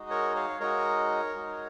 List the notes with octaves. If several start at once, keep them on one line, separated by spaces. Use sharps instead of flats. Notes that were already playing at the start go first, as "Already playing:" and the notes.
Already playing: G#3 D#4 F#4
A#4 C#5
C#5 F5
G#3 D#4 F#4 A#4 C#5
G#3 D#4 F#4